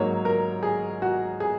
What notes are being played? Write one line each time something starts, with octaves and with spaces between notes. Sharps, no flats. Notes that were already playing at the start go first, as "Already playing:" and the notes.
Already playing: G#2 F#3 A#3 C#5
A#4
G#4
F#4
G#4